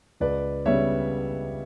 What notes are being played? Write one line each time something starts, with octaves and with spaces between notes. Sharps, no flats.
C#2 B4 D5
C#3 G3 B3 C#5 E5